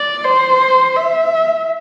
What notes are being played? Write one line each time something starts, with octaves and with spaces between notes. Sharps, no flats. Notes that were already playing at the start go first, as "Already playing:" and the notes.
Already playing: D5
C5
E5